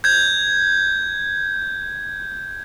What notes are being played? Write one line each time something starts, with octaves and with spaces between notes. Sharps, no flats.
G6 G#6